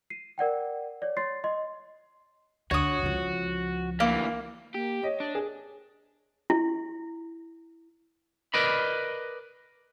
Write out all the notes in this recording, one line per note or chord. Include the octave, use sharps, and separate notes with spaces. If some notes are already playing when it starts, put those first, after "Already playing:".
C7 D#7
A#4 D5 F#5 G5
C#5 D5
C#5 C6 A6 C7
D#5 C6
D2 F#4 C#5 D#6
C#2 F3
D2 E3 A#3
A#3 G4
C#5 D#5
D4
G#4
E4
A#4 B4 D5 D#5 B5